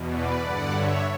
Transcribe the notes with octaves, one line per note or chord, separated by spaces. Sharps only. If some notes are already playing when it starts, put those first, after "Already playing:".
Already playing: E2 B2
B4 D5
G2 D3 D5 F#5
C#5 E5